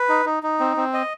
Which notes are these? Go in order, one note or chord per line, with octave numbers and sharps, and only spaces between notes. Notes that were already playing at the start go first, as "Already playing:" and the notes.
Already playing: B4
D#4
D#4
D#4
C4
C4
D#5